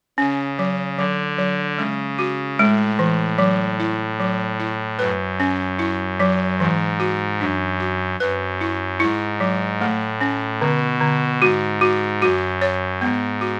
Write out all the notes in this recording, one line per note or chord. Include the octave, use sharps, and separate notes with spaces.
C#3 C#4
F#3
D3 F#3
F#3
C#3 G#3
F#4
A2 G#3
E3
F#3
E4
F#3
E4
F#2 B4
C#4
E4
F#3
G#2 E3
F#4
F#2 D4
F#4
F#2 B4
E4
G#2 E4
F#3
A2 A3
C#4
B2 D3
D3
G#2 F#4
F#4
F#2 F#4
C#5
G#2 B3
F#4